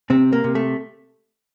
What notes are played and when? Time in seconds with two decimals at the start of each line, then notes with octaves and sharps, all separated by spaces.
0.10 C3 C4
0.33 A#3
0.44 C3
0.55 A3